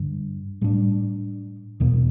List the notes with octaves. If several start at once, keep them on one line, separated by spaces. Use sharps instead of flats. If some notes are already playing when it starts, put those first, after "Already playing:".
Already playing: G2 D3
A2 G3 D4
E2 B2 B3